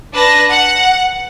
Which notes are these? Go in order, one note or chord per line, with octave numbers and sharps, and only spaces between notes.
D4 B4 A5 A#6
F#5